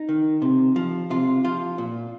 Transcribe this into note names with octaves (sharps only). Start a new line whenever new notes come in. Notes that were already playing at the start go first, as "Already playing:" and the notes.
Already playing: D#4
D#3
C3
F3
C3 F4
F3 F4
A#2